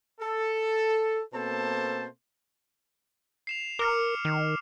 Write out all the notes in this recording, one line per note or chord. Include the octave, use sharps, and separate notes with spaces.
A4
B2 A#3 C4 A4 C5 A5
C7 E7 F7
A#4 D6 F6 C#7
D#3